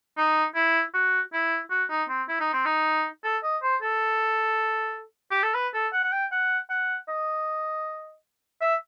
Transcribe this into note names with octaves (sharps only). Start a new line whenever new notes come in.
D#4
E4
F#4
E4
F#4
D#4
C4
E4
D#4
C4
D#4
A4
D#5
C5
A4
G4
A4
B4
A4
F#5
F#5
G5
F#5
F#5
D#5
E5